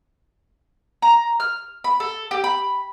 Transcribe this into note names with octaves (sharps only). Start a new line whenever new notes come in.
A#5
F6
B5
A4
G4
B5